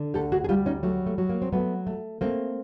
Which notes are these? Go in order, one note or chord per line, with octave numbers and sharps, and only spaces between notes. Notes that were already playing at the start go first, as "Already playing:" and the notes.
Already playing: D3
D2 G4 A4
F#4 G#4
G#4
G3 F4 G4
C#4 D#4
F#3 A3
A3
F#3
A#3
C4
F#3 A3 B3
A3
A3 A#3 C4